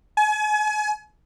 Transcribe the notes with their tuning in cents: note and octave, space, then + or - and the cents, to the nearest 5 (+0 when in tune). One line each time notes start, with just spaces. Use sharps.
G#5 +35